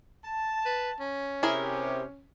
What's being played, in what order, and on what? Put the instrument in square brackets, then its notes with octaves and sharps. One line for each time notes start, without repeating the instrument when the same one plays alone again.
[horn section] A5
[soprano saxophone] B4
C#4
[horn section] C3 G4 [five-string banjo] E4 G#4 A#4